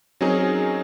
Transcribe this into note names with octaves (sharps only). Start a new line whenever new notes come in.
F#3 C4 C#4 D#4 G#4 A#4